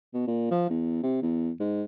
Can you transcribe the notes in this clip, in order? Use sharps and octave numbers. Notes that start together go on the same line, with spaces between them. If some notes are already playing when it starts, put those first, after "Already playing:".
B2
A#2
F3
E2
C3
E2
G#2